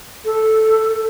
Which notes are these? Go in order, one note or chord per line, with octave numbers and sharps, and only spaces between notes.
A4